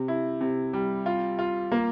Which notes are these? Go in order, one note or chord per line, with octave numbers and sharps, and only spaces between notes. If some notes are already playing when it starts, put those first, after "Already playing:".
Already playing: C3
E4
C3
G3
F4
F4
A#3